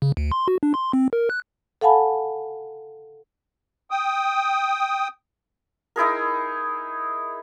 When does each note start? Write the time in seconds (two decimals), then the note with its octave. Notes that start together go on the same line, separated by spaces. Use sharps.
0.02 C#3
0.17 D2
0.32 C6
0.48 F#4
0.63 D4
0.74 C6
0.93 C4
1.13 A#4
1.30 F#6
1.81 A4 F5 F#5 G#5 A5 B5
3.91 G5 D#6
5.96 D#4 E4 G#4 A#4